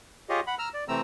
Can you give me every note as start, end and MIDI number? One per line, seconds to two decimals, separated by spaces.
0.29 0.40 65
0.29 0.40 67
0.29 0.40 68
0.29 0.40 73
0.29 0.40 75
0.47 0.55 78
0.47 0.55 83
0.59 0.69 82
0.59 0.69 88
0.59 0.69 89
0.74 0.84 74
0.88 1.01 48
0.88 1.01 52
0.88 1.01 57
0.88 1.01 60
0.88 1.01 82
0.88 1.01 88